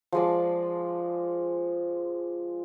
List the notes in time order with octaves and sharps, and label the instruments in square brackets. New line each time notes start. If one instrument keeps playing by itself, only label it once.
[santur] F3 G#3 D5